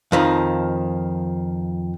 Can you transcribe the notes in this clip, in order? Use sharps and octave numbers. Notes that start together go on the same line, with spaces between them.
F2 D#3 F3